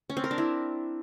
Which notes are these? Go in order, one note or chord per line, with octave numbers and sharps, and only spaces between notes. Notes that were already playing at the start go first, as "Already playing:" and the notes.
C#4
C4
A#4
D4
E4